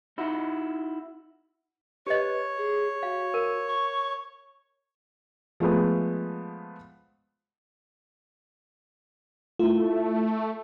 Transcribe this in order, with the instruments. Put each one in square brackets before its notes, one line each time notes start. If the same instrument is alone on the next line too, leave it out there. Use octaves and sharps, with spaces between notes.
[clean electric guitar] D#4 E4 F#4
[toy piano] G4 D#5 [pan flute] B4 [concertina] C#5
[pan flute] G#4
[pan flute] F#4 [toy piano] F5
[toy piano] A#4
[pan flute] C#6
[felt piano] F3 G#3 A3 B3
[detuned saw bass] A3 [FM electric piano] E4 F4